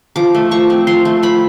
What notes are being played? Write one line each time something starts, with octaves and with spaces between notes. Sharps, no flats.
F3 D6
A3
F3 C#6
C4
F3 C6
A3
F3 B5